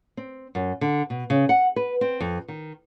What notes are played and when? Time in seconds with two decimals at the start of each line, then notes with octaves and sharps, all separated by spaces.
0.17 C4
0.55 F#2
0.81 D3
1.10 B2
1.30 C#3
1.49 F#5
1.76 B4
2.01 C4
2.20 F2
2.48 D#3